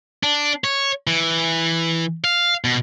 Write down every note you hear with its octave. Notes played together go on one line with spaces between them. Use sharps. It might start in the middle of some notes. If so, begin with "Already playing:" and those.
D4
C#5
E3
F5
B2